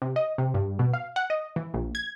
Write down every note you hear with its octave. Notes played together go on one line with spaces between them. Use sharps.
C3
D#5
C3
G2
B2
F5
F#5
D#5
E3
A#1
G#6